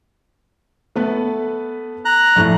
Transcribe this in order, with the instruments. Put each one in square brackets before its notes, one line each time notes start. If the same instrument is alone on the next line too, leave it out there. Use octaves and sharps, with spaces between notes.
[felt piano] A3 B3 B4
[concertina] A#5 F#6
[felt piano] A#1 A2 A3